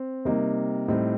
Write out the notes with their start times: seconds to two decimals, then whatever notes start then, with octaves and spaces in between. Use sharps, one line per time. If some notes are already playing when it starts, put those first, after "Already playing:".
Already playing: C4
0.25 C3 G3 A#3 D#4
0.88 A2 G3 C4 D#4